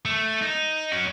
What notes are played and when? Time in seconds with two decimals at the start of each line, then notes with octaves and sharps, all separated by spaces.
0.05 A3
0.42 D#4
0.92 C#4 F#4